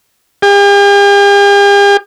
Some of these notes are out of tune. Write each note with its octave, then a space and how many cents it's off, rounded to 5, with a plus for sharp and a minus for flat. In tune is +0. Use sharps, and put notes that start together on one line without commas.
G4 +45